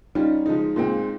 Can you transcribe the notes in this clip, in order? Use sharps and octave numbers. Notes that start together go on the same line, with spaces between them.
G3 C#4 D#4 F4
F3 G#3 D#4
A#2 G#3 C4 F4